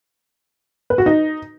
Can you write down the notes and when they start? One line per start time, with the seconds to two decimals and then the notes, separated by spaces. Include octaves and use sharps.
0.90 B4
0.98 F#4
1.06 D#4